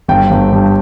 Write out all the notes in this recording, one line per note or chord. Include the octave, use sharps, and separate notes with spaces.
G1 G5
G1
G2